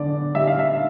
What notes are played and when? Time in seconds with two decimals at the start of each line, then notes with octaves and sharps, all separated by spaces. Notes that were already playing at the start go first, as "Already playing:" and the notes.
Already playing: D3 B3 D5
0.34 G3 E5
0.47 F5
0.59 E5